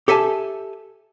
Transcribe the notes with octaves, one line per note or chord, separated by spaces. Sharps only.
G4 A4 E5 G#5 A5